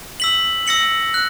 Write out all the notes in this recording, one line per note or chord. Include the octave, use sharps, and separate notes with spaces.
E6 B6 F#7
E6 A#6 C#7 F#7
F#6